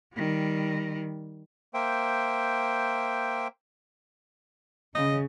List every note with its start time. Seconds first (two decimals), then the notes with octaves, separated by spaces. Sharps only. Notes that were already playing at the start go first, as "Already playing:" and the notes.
0.14 D#3 G3
1.74 A#3 C5 E5 G5
4.95 C#3 D#5